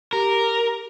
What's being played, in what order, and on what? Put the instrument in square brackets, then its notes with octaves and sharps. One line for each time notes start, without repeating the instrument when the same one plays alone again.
[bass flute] G4 [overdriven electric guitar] A#4